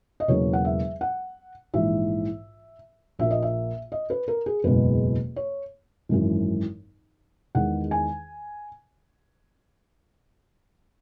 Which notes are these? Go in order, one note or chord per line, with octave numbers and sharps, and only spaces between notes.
D#5
E1 E2 C#3 F#3 A#3 C#5
F#5
E5
F#5
A#1 G#2 E3 E5
A#1 A#2 A#3 E5
D#5
E5
D#5
B4
A#4
G#4
F#1 E2 B2 G#3 B4
C#5
G#1 F#2 E3
E2 D#3 G#3 F#5
G#5